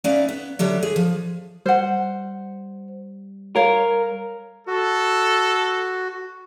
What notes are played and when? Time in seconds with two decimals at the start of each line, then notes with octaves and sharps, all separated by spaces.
0.04 B3 C#4 D#4 D5 E5 F5
0.29 B3
0.59 D3 F#3 G3 E5
0.83 G#4
0.96 F3
1.66 G3 C5 F#5
3.56 A#4 C#5 F5
4.67 F#4 A4